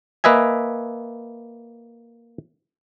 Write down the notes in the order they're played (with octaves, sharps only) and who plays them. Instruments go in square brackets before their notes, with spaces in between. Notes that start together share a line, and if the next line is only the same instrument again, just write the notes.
[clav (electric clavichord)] A#3 B4 D#5 E5 G#5